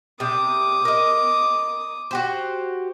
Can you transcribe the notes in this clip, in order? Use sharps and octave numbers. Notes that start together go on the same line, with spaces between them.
C3 G3 D6 D#6
A#4 D#5
F#4 G4 C5